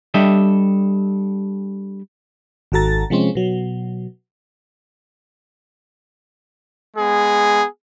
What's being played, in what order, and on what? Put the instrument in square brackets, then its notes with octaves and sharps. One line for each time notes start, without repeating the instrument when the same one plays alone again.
[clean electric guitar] G3 D4 G4 A4 D#5 E5
[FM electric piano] G#1 D#3 F#4 A4 A#5 A6
C3 F3 G#3 C4 C#4
B2 F#3
[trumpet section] G#3 B3 G#4